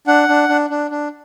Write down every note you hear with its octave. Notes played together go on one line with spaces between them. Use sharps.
D4 F#5
D4
D4
D4
D4